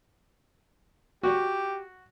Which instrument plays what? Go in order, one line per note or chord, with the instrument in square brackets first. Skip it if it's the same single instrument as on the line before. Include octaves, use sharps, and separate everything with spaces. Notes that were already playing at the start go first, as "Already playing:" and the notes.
[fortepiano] F#4 [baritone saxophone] G4